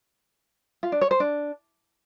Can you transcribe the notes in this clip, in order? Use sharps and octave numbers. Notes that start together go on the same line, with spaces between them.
F4
D4
C#5
C5
D4